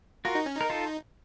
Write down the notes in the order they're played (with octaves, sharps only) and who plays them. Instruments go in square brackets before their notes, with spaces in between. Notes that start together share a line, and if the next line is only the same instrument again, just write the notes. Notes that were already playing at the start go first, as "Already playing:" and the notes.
[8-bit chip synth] F4 [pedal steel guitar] F#4 A#4
[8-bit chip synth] D#4
C#4
[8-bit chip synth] D#4 [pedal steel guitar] A#4
[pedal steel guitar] F4 A4